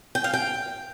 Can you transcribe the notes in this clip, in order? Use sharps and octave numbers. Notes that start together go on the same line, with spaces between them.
G5
F5
G5